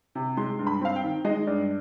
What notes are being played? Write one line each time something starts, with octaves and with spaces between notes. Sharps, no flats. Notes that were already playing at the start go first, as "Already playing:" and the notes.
C3
G#3 C6
G2
B5
C4 F5
G5
D#3
G#3 D#5
G2 D5